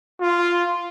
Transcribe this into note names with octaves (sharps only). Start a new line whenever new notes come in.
F4